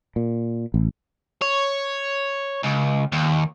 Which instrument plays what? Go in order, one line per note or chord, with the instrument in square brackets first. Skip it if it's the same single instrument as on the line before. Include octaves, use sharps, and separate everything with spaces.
[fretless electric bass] A#2
A1
[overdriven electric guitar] C#5
C#2
D#2